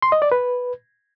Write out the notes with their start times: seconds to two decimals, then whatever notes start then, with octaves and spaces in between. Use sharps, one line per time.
0.02 C6
0.12 D#5
0.22 D5
0.32 B4